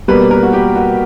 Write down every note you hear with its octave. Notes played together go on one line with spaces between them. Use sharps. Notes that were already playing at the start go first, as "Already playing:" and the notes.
B2 G3 A#3 B4
A#4
F#4
G4
F#4